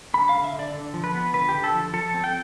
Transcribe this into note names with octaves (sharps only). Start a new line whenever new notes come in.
D3 B5
F5
D3
E5
D3
D5
D3
F3
B4
B3
D3 B4
G4
D3
A4
F3
F3 A4
C4
G5